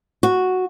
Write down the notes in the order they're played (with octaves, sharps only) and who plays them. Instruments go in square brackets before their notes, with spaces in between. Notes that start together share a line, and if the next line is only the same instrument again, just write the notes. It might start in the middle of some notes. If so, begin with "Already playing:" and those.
[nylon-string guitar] F#4